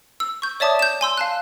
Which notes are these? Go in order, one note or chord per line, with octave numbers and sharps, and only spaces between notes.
E6
C#6 G6
C#5 D5 E5 A5 D6 D#6
G6 E7
G#5 C6 E6
F5 A5 F#6